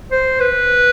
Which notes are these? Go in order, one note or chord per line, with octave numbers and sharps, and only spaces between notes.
C5
B4